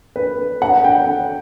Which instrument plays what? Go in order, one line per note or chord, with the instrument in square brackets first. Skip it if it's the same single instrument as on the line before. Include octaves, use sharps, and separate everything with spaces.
[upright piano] B4
F#5
G5